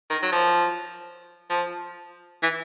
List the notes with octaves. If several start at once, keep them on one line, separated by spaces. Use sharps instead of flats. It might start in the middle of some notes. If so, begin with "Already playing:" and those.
D#3
F#3
F3
F3
E3